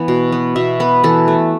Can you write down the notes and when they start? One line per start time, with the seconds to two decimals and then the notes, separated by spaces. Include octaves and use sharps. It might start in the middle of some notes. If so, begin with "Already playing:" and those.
Already playing: E3 B3
0.08 B2
0.32 B3
0.56 B2 E5
0.80 B3 B4
1.04 E3 A4
1.28 A3